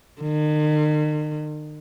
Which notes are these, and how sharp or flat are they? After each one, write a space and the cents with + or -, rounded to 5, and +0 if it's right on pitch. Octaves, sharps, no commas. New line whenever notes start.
D#3 -40